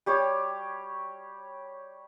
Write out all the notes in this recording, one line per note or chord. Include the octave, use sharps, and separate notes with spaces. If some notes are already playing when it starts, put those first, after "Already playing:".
G3 G4 C#5